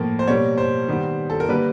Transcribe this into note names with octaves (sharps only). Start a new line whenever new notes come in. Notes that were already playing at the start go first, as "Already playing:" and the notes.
Already playing: A2 F3 A#3
C5
B2 G3 A#3 C#5
C5
D#3 G3 B3
A4
A#4
D3 G3 A#3 B4